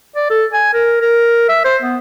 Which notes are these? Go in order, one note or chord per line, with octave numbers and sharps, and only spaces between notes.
D5
A4
G#5
A#4
A#4
E5
C5
B3